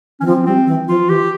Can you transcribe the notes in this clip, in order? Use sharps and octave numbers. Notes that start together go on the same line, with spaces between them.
E3 C#4
F3 C4
G3 C4
E3
F3 F4
E3 G4